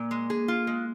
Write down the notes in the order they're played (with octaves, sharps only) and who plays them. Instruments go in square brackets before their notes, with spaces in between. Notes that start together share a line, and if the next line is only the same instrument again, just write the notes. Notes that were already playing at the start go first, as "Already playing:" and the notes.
Already playing: [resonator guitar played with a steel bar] A#2 [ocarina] A#3
[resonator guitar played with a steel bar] G#3
G#4
F4
G#3